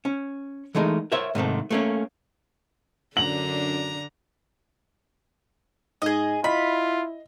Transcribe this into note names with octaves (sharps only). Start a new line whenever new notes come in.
C#4
E3 G#3 A3 D#4 A#4
A#4 C5 C#5 E5
G#2 C3 D#3 A3
A3 A#3 C#4
F#2 D3 D4 A#5 F#7
G#2 G#4 D#5
E4 F4 D#5 B5